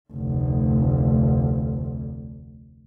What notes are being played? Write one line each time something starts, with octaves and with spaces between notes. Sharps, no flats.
F1 D2